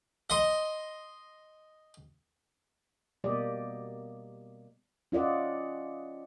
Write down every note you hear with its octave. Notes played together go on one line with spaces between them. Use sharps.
D#5 C6
B2 G3 A#3 G4 D5 D#5
C#4 F4 D5 D#5 F#5